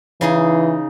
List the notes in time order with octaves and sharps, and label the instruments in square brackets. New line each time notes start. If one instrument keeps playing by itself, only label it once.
[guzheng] C#3 D#4 G#4 [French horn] E3